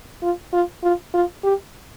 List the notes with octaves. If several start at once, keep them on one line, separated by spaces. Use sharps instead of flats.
F4
F4
F4
F4
G4